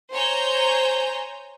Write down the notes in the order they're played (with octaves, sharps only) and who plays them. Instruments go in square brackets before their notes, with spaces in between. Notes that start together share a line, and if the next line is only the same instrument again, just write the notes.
[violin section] C5 C#5 G#5 A#5 G6